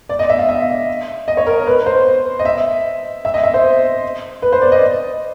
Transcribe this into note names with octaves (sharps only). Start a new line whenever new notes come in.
D5
D#5
E5
F5
E5
D#5
C#5
A#4
B4
C5
D#5
E5
E5
D#5
E5
C5
B4
C5
D5
D#5